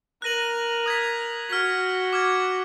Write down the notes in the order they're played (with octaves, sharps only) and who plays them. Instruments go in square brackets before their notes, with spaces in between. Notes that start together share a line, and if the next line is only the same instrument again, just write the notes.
[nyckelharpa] A#4 [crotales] F#6 A#6 D#7 F#7
[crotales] D#6 G#6 B6
[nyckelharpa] F#4 [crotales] F6 G#6 B6
[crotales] D6 F6 G#6